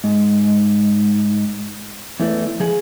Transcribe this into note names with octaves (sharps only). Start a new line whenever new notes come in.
G#2
E2 E3 A3
F3 G#4